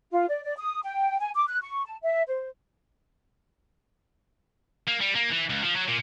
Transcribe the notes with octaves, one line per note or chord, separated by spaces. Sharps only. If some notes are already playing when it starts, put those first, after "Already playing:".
F4
D5
D5
D#6
G5
G#5
D6
F#6
C#6
A5
E5
C5
A#3
G3
A#3
E3
C#2
F3
F#3
A#2